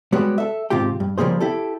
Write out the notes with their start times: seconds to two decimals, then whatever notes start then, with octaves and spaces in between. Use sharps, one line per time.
0.12 G3 G#3 B3 F#4 G4 C#5
0.38 A4 E5
0.70 D#2 G#2 C3 F4 G4 G5
1.00 G2
1.18 C#3 F3 G3 A#3 G#4 C5
1.40 E4 G4 A4